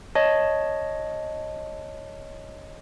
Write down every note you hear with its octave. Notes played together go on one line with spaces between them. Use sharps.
C#5 D#5 A5